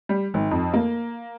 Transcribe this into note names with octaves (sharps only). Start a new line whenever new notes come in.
G3
G#1
F2
A#3